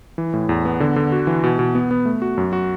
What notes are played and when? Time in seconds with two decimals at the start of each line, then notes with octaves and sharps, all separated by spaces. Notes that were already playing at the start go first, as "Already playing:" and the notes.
0.18 E3
0.33 A2
0.49 E2
0.65 B3
0.80 D3
0.96 D3
1.12 F#4
1.27 E3
1.44 B2
1.59 B2
1.75 B3
1.91 B3
2.05 A3
2.22 F#4
2.38 F#2
2.53 F#4